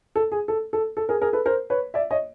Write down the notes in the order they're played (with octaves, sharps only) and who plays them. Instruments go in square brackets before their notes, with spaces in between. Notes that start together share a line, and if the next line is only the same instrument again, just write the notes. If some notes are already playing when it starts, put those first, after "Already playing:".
[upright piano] A4
G#4
A4
A4
A4
G#4 A#4
G#4 A#4
A4 B4
A#4 C5
B4 C#5
D5 E5
C#5 D#5